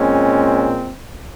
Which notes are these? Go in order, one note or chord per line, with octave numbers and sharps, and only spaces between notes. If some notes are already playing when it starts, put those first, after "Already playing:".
Already playing: A#2 G#3 C4 C#4